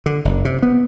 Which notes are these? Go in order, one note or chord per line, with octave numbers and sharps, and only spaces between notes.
D3
F#1
C3
B3